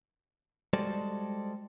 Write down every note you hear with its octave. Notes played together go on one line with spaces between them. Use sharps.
G3 G#3 F#4 A4 C5 D5